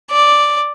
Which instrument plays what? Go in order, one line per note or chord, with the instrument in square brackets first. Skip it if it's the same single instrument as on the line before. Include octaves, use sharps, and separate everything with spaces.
[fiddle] D5